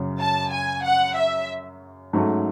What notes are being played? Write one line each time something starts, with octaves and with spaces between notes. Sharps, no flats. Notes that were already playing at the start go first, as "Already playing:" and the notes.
Already playing: F#2 C#3 F#3 C#4
A5
G#5
F#5
E5
G#2 F#3 A3 C#4